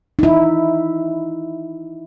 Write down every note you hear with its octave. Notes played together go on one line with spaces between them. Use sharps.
D#4 E4